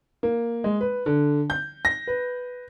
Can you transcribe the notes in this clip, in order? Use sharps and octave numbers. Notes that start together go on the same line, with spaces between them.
A#3
G#3
B4
D3
G6
A#6
B4